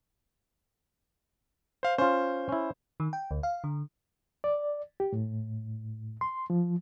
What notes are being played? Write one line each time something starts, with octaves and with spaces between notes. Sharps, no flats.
C5 F5
C#4 F4 C5
C#4 E4
D#3
G5
D2
F5
D3
D5
G4
A2
C6
F3